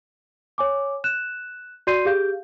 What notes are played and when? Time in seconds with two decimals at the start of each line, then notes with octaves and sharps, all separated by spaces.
0.58 C#5 G#5 D6
1.04 F#6 E7
1.87 F#4 D5 C6 G6 C7 D#7
2.05 G4 G#4 F5 G6